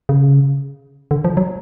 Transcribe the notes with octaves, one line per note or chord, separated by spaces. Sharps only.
C#3
D3
F3
F#3